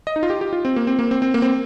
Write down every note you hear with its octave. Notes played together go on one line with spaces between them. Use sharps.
D#5
D#4
F4
G4
G4
F4
C4
A#3
C4
A#3
C4
C4
A#3
C4